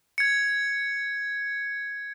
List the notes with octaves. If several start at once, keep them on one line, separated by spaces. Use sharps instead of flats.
G#6 C#7